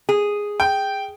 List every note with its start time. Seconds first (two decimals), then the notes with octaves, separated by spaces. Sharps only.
0.09 G#4
0.60 G5